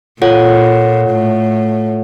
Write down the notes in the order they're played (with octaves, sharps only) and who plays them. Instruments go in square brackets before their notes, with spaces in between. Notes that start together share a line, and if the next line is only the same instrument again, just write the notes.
[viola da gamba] A#2 [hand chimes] F4 A4 C#5 F#5
[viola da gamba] A2